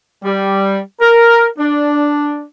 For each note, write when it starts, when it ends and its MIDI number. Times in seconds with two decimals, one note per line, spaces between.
0.24 0.77 55
1.00 1.46 70
1.59 2.44 62